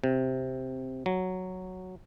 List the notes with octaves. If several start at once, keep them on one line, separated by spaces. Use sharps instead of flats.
C3
F#3